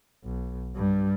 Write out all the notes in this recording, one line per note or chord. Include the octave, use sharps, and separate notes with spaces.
B1
G2 G3